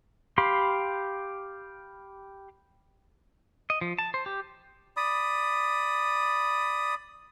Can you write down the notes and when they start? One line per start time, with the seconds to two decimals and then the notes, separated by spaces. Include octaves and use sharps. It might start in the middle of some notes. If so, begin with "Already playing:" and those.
0.38 G4 F5 B5 C6
3.70 D#5
3.81 F3
3.99 A5
4.14 C5
4.26 G4
4.97 D5 B5 D#6